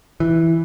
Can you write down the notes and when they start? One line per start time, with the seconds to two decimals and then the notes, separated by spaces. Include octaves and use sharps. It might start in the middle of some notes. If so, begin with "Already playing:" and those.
0.20 E3